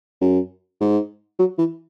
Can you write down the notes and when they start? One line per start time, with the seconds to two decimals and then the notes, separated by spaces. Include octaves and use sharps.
0.21 F#2
0.80 G#2
1.39 F#3
1.58 E3